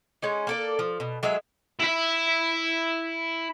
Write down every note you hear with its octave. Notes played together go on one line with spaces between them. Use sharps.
G#3 C#4 D#4
A#3 A4 D5
F3
B2
F#3 G#3 A#4 E5
E4 E5